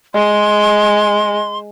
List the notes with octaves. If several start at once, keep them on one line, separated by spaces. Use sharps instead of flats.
G#3 C6